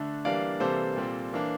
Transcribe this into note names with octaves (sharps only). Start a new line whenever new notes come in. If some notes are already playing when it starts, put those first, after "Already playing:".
Already playing: D3 A3 D4
E3 G3 A#3 D4 D5 F5
C3 E3 G3 A#3 A4 C5
A#2 G3 C4
E3 A#3 D4